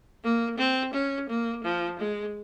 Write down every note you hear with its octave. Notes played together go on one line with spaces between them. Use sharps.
A#3
C4
C#4
A#3
F3
G#3